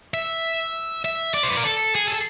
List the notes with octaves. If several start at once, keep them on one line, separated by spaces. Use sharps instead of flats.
E5
E5
D5
C5
B4
A#4
A4
G#4
A4